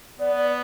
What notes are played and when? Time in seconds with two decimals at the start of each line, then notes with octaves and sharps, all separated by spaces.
0.19 B3 D5
0.36 D5